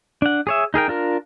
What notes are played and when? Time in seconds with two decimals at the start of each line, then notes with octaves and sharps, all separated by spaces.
0.22 D4 F#5
0.47 G#4 C#5 E5
0.74 D#4 G#4 A#4 G5
0.88 D4 F4 A#4